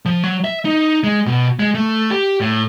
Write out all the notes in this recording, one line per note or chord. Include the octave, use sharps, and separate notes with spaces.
F3
F#3
E5
D#4
G#3
B2
G#3
A3
G4
A2